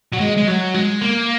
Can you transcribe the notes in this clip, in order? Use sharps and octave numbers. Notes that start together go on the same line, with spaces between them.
F#3
G#3
G#3
F#3
G#3
A#3